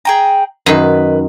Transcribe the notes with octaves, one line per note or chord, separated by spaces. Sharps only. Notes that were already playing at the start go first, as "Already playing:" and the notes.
G#4 G5 A#5
F#2 D#3 B4